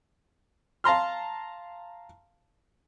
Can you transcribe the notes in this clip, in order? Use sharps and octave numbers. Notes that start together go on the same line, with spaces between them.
F5 A5 A#5 C6 F6